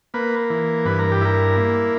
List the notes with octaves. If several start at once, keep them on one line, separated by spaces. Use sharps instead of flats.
A#3 B4
E3
G2 B4
A#4
G4
E4 A#4
A#3